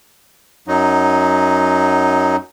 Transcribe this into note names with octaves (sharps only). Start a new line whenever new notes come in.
F#2 F#3 D#4